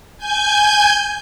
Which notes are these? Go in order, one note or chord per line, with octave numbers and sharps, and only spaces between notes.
G#5 G6 G#6